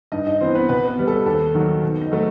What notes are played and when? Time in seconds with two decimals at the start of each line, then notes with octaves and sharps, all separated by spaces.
0.12 G2 D#4 D#5
0.26 D#4 D#5
0.40 E3 B3 C4 C5
0.55 B3 B4
0.69 B2 B3 B4
0.87 B3 B4
0.98 G3 B3
1.07 A4
1.26 D#2 A4
1.54 D#3 F#3
1.83 B2
2.01 D#4 D#5
2.11 F#3 A3